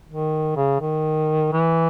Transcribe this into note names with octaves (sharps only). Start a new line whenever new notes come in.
D#3
C#3
D#3
E3